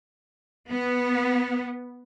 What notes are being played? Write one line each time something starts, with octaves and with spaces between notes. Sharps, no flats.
B3